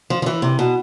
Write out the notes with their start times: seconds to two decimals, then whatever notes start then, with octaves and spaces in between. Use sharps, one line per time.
0.10 F3
0.22 F3
0.26 E3
0.42 C3
0.59 B2